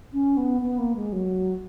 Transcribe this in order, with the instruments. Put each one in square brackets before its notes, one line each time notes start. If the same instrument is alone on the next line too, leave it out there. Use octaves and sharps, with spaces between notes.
[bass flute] C#4
B3
B3
A#3
G#3
F#3